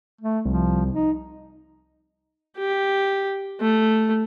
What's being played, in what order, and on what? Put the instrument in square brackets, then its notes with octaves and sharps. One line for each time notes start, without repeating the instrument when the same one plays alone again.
[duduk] A3
[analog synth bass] C2 [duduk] F3
[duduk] D#4
[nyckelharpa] G4
A3